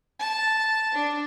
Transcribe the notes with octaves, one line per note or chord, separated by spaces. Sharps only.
A5
D4